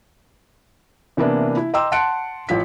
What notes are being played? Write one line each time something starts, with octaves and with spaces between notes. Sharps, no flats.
C3 E3 A#3 B3 D4 E4
E4
D#5 G5 A#5 C6 D6 E6
F#5 A5 C6 F#6 C#7 D7
A1 F3 B6